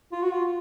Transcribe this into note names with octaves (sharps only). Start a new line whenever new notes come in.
F4
F#4
F4